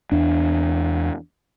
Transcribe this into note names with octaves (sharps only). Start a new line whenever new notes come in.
E2 D4